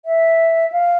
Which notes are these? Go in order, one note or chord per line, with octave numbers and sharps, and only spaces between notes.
E5
F5